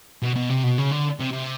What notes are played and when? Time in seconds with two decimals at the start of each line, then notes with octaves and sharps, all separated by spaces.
0.23 B2
0.36 B2
0.50 C3
0.64 B2
0.78 C#3
0.91 D3
1.19 C3
1.33 C3